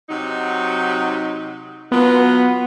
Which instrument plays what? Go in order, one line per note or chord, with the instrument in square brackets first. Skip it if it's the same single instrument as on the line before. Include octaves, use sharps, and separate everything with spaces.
[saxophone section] C3 F#3 D#4
[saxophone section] F#3 F4 B4 [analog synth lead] B3